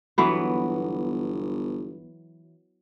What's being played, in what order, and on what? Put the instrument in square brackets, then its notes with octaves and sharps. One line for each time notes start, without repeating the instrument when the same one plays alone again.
[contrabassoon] G1 [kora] E3 F#3 B3